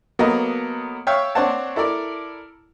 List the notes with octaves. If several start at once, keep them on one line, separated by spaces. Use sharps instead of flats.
F#3 A#3 B3 A4 A#4 D#5
C#5 E5 F5 G5 C#6 E6
C4 D4 C5 C#5 F#5 A5
E4 A4 A#4 D5